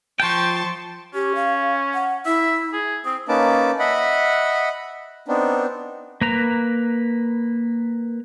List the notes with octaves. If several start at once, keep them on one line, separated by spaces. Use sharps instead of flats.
F3 G5 A5 C6 C#6
C#4 G4
F5
F#5
E4 E5
G#4
C4 D#6
A#3 C#4 D#4 B4 A5 D6
D#5 E5 F#5 B5
B3 C4 D4 D#4
A#3 B4 A#5